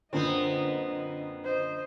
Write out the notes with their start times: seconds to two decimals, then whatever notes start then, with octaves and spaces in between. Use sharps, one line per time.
0.13 F#2 A#2 D3 B3 C4 D#5
1.44 C5 D#5